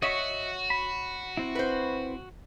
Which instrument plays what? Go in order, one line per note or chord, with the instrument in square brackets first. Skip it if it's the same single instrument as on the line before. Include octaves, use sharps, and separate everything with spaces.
[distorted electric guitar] F#4 [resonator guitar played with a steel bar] C#5 [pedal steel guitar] D#5 E5 C#6
[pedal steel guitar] B5
C4 E4
[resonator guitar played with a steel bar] B4 C5